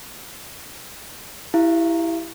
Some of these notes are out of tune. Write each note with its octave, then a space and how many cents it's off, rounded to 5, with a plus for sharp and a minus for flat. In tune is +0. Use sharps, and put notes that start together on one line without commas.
E4 +0 G4 +0 F5 -40